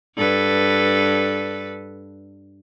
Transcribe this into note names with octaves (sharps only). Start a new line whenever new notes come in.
G2 A4 B4